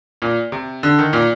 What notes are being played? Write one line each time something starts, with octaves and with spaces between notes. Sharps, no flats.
A#2
C3
D3
D#3
A#2